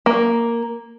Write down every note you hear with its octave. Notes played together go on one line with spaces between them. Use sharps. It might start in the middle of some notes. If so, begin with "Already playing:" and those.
A#3